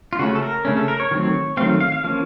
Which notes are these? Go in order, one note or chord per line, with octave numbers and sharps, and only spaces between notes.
F4
C#3 A3 C#4 F#4
A4
A#4
C#3 A3 C#4
A4
A#4
C#5
D#3 F#3 A3 C4
D#3 F#3 A3 C4 F5
F5
F5
F3 A#3 C#4